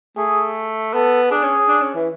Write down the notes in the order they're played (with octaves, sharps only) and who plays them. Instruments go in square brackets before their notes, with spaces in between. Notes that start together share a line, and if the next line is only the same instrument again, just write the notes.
[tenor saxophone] A3 [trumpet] G#4
[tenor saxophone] B3 [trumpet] A4
[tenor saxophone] D4 [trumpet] G#4
[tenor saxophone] C#4
D4
C#4
E3